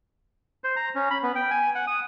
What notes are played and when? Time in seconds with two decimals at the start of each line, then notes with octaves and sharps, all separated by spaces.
0.64 C5
0.76 A#5
0.95 C#4
1.10 B5
1.23 B3
1.35 G5
1.51 G#5
1.75 F#5
1.87 D#6